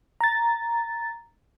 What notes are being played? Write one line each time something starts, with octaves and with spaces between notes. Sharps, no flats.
A#5 A6